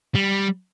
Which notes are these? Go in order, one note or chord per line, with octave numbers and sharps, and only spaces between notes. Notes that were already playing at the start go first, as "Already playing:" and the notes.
G3